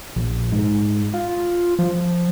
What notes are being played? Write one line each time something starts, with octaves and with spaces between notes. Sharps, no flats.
A#1
G#2
F4
F3